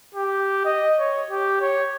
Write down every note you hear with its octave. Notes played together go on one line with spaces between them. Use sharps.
G4
D#5
C#5
G4
C#5